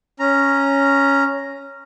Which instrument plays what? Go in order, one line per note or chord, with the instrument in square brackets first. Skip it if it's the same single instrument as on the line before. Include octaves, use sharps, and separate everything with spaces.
[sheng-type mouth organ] C#4 A#5